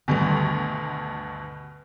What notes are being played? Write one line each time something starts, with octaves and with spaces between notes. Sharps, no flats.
D2 G2 B2 D3 D#3 G3